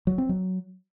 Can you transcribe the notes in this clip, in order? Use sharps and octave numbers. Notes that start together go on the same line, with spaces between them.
F#3
C4
F#3